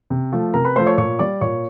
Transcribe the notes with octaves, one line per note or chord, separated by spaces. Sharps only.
C3
F3 A3
C3 A#4 A#5
B4 B5
F3 A3 C5 C6
C#5 C#6
A#2 C#5 C#6
G3 D5 D6
A#2 C#5 C#6